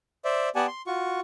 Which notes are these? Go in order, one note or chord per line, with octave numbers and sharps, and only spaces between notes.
C5 D5 E5
B3 G4 D5 F#5 G#5 A5
C6
F4 F#4 C#6